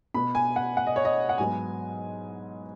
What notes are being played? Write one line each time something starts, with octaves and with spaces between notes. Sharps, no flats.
B2 B3 B5
G#5
F#5
F#5
D#5
C#5
D#5
F#5
G#2 F#3 B3 G#5